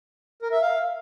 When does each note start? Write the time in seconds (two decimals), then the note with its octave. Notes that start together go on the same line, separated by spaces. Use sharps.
0.42 A#4
0.52 E5
0.61 F5